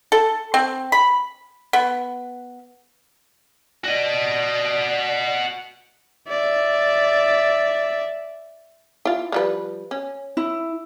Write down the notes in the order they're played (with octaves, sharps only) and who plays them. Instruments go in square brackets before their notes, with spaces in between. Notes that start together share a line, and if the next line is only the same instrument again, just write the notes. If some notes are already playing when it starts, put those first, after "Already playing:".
[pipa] A4
C4
B5
B3
[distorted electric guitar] F#4 D#5 [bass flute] D5
[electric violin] D5 E5
[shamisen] E4 F4
F3 G3 B4
C#4
[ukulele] E4